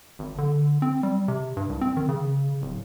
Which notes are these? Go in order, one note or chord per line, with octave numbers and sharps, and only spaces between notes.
G#1
D3
C4
G3
C3
G2
C2
C4
D#3
C#3
D1